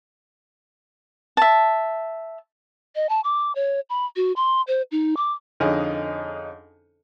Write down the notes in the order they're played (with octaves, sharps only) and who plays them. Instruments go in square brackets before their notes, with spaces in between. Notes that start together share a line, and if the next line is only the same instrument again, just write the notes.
[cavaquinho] E5 A5
[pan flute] D#5
A5
D6
C#5
B5
F#4
C6
C5
D#4
D6
[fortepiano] F2 D3 C#4 D#4 G#4 D#5